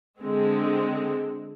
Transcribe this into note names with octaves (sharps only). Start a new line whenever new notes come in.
D3 G#3 C4